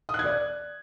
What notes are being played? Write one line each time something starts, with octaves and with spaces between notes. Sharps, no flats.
D#6
F#6
G#6
D5